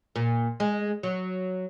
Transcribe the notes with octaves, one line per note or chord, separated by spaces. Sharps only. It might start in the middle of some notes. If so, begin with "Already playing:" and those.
A#2
G#3
F#3